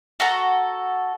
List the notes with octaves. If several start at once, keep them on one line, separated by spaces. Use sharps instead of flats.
F#4 A4 A#5